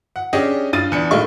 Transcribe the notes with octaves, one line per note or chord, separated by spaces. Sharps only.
F#5
C#4 D4 G4 G#4 D#5
G2 F4 D#6 A6 D#7
E2 D4 C#7
A2 D#3 G#3 F5 C#6